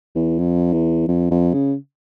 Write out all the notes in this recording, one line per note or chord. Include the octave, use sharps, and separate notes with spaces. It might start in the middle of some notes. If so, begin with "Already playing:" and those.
E2
F2
E2
F2
F2
C#3